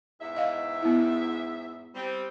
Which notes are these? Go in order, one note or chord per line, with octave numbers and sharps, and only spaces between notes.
E2 G#2 E5
D#5 F5
B3 E4
G3 C4